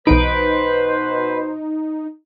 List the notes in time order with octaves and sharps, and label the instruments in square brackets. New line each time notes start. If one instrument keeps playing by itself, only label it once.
[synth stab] B1 E2 D7 [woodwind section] B2 C5 [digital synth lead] D#4 [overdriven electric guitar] B4